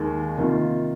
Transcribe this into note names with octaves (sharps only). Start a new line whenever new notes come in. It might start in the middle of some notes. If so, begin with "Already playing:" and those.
Already playing: D#2 D#3 G#3
C3 D#3 A#3 F4